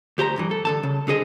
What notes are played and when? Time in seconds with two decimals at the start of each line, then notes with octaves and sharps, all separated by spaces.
0.18 D2 G4 C5 A#5
0.37 G2 E3
0.51 A4
0.65 D3 A4 A5
0.83 C#3
1.07 C2 D3 G#4 D#5